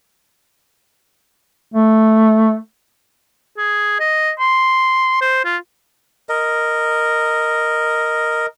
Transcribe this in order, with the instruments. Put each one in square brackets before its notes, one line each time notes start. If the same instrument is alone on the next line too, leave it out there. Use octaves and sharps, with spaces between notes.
[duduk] A3
[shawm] G#4
D#5
C6
C5
F4
[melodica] A#4 D#5